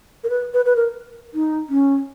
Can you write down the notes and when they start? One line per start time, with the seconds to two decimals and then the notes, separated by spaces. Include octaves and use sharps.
0.24 A#4
0.30 B4
0.54 B4
0.65 B4
0.76 A#4
1.34 D#4
1.70 C#4